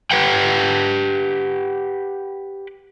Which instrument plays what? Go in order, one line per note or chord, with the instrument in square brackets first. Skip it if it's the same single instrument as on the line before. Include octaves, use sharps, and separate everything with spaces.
[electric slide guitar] G4 B4 F#5 G5